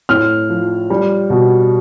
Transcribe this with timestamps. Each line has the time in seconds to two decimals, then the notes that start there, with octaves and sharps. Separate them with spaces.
0.09 A2 F6
0.49 F3
0.90 G3
1.30 B2